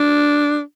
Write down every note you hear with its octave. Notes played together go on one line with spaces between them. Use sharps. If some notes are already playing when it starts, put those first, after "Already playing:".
Already playing: D4